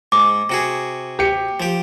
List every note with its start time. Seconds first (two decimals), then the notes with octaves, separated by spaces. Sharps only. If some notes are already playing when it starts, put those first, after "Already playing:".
0.12 G#2 D6
0.50 C3 F#4 G#4
1.19 G4 C#7
1.60 F3 G4